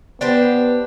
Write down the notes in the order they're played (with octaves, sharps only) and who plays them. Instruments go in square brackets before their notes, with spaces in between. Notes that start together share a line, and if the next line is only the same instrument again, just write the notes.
[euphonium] B3 [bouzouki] D4 G4 C5